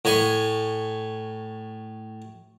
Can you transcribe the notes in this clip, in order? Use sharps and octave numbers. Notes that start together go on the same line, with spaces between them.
A2 G#5 C#6